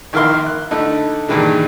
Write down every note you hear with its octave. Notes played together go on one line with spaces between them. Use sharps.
A#1 D#3 E4 A#4 F5 C6
F#6
D3 A3 D#4 E4
G2 A#2 D#3 E3 G#3 D4